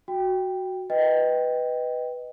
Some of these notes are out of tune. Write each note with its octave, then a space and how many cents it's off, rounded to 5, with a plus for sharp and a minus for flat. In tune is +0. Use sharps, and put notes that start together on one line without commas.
F#4 +0 G5 +5
B4 +0 D#5 +0 G5 +0